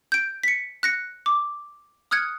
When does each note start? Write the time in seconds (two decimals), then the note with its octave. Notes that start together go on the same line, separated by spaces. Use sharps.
0.12 G6 D7
0.43 B6 C#7
0.83 F#6 A#6 C#7
1.26 D6
2.11 D#6 F6 F#6 G#6 C#7